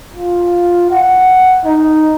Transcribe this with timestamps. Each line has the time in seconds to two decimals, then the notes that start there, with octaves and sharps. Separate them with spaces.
0.14 F4
0.91 F#5
1.65 D#4